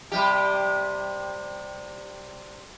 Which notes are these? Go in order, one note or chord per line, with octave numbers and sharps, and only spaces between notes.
C3 G3 G4